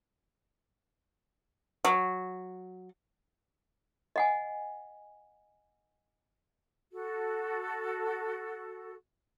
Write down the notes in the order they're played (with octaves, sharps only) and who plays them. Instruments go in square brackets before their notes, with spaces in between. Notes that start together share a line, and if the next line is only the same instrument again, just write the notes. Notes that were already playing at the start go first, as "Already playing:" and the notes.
[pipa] F#3
[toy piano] D#5 F#5 G#5
[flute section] F#4 A4